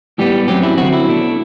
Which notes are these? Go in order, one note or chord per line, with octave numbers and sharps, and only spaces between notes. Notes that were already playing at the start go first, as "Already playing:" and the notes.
A2 G3 B3 G4
F#2 F#3 C4 G4
E4
D3 F#3 C4 F#4
E4
B2 A3 D4